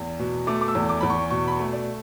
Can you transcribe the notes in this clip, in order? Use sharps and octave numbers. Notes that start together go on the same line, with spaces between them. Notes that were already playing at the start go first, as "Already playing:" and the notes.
Already playing: E2
B2
A3 D6
D6
E6
E2
D6
E2 B5
C#6
B2 C#6
B5
C#6
A3
D5